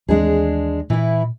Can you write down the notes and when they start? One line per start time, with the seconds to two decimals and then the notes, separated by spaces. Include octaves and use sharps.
0.08 D#2 E3 G#3 C4 D4 G#4
0.90 A#2 E3 E4